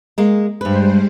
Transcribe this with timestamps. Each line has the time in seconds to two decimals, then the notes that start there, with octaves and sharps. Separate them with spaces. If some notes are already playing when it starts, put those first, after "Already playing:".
0.18 G#3 A#3
0.61 G2 G3 G#3 B4 C5